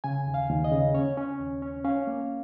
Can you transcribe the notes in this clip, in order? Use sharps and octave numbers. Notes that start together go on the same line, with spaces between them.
C#3 G#5
D#2
F5
D#2
D#5
C#3
C#4 C#5
C#4
D#2
C#4
C#4 F5
A#3